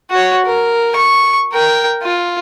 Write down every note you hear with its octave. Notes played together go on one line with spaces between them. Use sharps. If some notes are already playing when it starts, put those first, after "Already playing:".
F#4 C#5
A#4
C#6
A#4 G5
F4